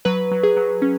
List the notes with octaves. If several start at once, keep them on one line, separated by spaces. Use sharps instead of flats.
F#3 B4
F#3
G#4
F#3
C#4